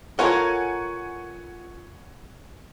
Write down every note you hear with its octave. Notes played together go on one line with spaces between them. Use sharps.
F4 A4 A#4 C#5 F5 F#5 G#5 C#6